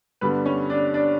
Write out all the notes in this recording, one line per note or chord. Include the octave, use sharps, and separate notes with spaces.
G2 D3 G3 B3 B4
C#4 C#5
D4 D5
D4 D5